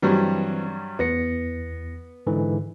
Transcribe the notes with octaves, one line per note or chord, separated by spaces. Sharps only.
G2 E3 F#3 G3 C4
E2 B3 A#6 C#7
G#2 D3 E3